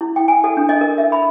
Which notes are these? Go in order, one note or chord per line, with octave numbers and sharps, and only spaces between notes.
E4
G5
G#5
A4
D4
D#5
A#4
E5
B5